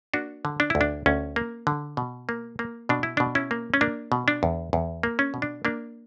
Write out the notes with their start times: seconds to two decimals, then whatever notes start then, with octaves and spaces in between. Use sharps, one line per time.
0.14 A#3 D4 F#4
0.45 D3
0.60 D4
0.70 D2 E4
0.81 D4
1.06 D2 C#4
1.36 A#3
1.67 D3
1.97 B2
2.29 A#3
2.59 A#3
2.89 B2 D4
3.03 E4
3.17 B2 D4
3.35 C#4 E4
3.51 A#3
3.74 C#4
3.81 A#3 D4
4.12 B2
4.28 D4
4.43 E2
4.73 E2
5.03 A#3
5.19 C#4
5.34 B2
5.42 D4
5.65 A#3 D4